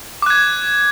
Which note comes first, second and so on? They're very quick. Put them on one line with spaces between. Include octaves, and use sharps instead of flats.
D6 F#6 G#6